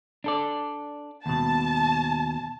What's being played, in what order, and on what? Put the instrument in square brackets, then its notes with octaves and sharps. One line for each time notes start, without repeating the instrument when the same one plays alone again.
[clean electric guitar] D4 A4 D5
[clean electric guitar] D#2 B2 [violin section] A5